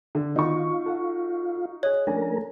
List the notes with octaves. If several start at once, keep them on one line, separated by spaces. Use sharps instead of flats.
D3
D#3 B3 D#4 F4 F#4 C#6
A4 F#5
G#4 C#5 D#5 F#6
F3 A3 C#4 D4 A#4 G#5